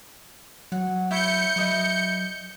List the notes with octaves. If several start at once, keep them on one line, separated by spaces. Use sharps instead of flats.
F#3 F#5
E4 C#5 E5 G6 C#7
F#3 B4 D#5 E5